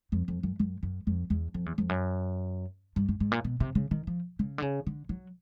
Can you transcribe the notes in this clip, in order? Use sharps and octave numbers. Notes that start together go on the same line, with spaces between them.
F2
F2
F#2
F#2
F#2
F2
E2
F2
E2
F2
F#2
G2
G2
G#2
A#2
B2
C3
C#3
D#3
F3
C#3
D3
C#3
D3
F#3